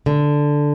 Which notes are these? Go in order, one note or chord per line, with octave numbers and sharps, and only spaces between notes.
D3